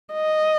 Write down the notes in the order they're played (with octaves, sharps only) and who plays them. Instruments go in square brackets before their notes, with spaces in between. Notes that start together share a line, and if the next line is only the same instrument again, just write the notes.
[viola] D#5